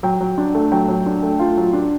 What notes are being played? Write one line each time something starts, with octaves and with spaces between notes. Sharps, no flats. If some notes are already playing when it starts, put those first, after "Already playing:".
F#3 G5
F#3
D4
A3
F#3 G5
F#3
D4
A3
F4
F#3
D4